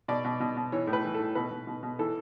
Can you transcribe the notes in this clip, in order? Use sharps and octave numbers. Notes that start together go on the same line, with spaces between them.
B2 D5
B2
B2
B2
E3 C#5
A2
B4
E3
A4
A2
B2 B4
B2
B2
B2
E3 A4